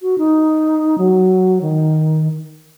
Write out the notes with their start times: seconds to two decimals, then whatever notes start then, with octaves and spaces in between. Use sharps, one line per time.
0.02 F#4
0.18 D#4
0.98 F#3
1.61 D#3